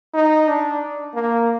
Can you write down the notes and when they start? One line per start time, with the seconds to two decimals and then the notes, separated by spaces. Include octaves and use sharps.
0.14 D#4
0.48 D4
1.15 A#3